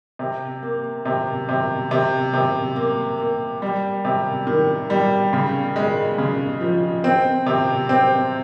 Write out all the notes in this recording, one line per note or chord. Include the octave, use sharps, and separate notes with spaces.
C3
A#3
C3
C3
C3
C3
A#3
A#3
G3
C3
D#3
G3
C#3
G#3
C#3
F3
C4
C3
C4